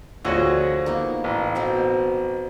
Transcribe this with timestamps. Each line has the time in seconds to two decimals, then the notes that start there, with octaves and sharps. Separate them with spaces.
0.25 D2 F3 F#4 G#4 C#5 D#5
0.86 A#3 B3 D#4
1.24 A1
1.55 B2 C4 C5